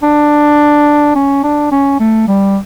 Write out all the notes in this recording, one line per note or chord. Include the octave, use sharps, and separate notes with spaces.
D4
C#4
D4
C#4
A3
G3